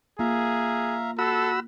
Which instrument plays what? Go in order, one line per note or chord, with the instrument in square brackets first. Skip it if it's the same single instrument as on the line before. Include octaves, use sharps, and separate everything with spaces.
[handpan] A#3 F4 [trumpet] G#4 [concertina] E5 F5 A#5
[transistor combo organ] F#4 B5 E6 [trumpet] A4